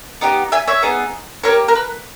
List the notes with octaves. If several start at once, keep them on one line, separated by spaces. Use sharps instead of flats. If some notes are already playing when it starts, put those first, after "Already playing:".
B3 D#4 G4
E5 G#5
C#5 E5
B3 D#4 G#4
A#3 E4 G4 A#4 C#5
A#4
B4